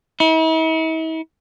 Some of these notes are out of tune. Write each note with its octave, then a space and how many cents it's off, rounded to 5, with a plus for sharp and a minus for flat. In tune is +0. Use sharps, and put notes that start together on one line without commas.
E4 -45